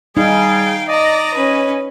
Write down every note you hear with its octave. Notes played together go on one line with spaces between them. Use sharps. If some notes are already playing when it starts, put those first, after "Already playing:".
G3 D#4 G#4 F5 G5
D5 D#5 A#5
C#4 B4